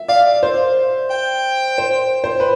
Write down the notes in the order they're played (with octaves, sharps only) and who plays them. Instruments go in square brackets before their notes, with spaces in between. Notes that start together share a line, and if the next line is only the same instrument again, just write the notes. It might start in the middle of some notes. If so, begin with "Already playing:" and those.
Already playing: [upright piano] E5
[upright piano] D5 [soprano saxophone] F5
[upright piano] C5
[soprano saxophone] G5
[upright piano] C5
C5
B4